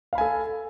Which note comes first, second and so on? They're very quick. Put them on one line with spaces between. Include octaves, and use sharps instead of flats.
F5 B5 G#5 A4